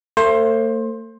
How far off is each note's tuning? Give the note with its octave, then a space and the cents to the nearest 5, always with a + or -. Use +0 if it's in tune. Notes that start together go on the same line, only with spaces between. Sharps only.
A3 +40 C5 +20